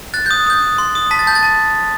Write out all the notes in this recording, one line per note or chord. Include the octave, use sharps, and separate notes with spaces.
F#6 A6
D#6 G6
D#6 G6
D#6
C6
D#6
A5 B6
A6
A5 G6
A6
A5